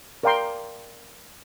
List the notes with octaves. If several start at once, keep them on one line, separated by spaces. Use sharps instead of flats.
A#4 D5 F5 G5 A#5 C6